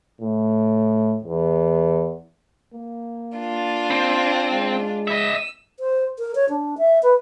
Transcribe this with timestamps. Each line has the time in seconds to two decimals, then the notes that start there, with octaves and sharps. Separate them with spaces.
0.21 A2
1.24 E2
2.74 A#3
3.38 D4 F4
3.90 C4
4.49 G#3
5.08 D#5 E5 E6
5.80 C5
6.19 A#4
6.35 C#5
6.49 D4
6.78 E5
7.03 B4